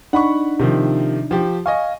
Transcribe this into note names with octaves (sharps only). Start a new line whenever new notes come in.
D4 D#4 F#5 B5 C#6
C3 D#3 F3
F3 G4
D#5 F5 G#5 C#6